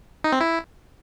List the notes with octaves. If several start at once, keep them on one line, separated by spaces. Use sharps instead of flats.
D#4
C4
E4